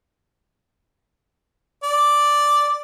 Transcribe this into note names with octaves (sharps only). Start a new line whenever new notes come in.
D5